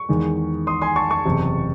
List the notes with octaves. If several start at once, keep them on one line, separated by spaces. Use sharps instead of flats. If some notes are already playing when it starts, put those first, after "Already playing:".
Already playing: C#6
E2 D#3 G#3
C6 D#6
G#5 C6
A5 C#6
A5 C#6
F#1 E2 C3